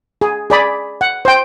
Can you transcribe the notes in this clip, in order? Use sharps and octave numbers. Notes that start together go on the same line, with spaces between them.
G#4
G#4 D5 B5
F#5
C5 G5